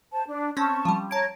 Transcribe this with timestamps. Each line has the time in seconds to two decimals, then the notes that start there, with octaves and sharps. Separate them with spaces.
0.12 C5 A5
0.27 D4
0.57 C4 C#4 A5 C#6
0.85 F3 G3
1.11 C#5 A5 A#5 G#6 D7